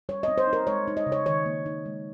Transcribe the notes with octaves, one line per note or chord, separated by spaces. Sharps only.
G3 C#5
C4 D#5
C5
D#4
A#4
G#3 C#5
D#4
D#5
C#3
C#5
D#3 C#5
A#3
D#4
G#3